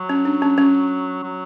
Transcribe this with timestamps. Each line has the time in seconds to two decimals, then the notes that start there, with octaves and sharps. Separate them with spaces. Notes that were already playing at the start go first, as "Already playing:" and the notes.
Already playing: F#3
0.09 C#4
0.25 D4
0.42 C#4
0.58 C#4
1.23 F#3